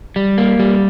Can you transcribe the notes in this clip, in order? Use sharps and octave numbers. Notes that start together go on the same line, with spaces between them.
G3
A#3
G3